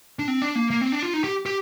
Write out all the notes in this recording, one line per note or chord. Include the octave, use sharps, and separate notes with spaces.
D4
C4
D4
A#3
A#3
C4
D4
F4
D#4
G4
G4